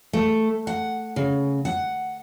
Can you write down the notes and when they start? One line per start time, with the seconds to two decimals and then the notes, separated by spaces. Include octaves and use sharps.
0.13 A3
0.67 F#5
1.16 C#3
1.65 F#5